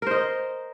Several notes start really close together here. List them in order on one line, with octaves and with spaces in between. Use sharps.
A#4 C5 D#5